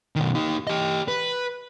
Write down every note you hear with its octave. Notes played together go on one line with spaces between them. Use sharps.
B2 D#3
D#4 G4
G4 D#5
B4